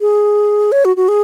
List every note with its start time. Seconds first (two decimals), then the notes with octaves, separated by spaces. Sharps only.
0.01 G#4
0.72 C#5
0.85 F#4
0.96 F#4
1.08 G#4